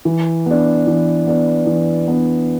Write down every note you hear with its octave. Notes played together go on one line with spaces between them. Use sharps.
E3
B3 D4
E3
B3 D4
E3
B3 D4